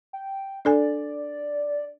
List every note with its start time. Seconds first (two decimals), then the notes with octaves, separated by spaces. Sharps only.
0.13 G5
0.65 D4 A4 D5 G#5